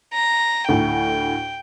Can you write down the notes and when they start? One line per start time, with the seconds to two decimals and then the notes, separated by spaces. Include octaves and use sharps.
0.14 A#5
0.69 D2 A2 G5